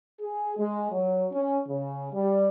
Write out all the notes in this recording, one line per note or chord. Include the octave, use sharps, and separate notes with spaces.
G#4
G#3
F#3
C#4
C#3
G3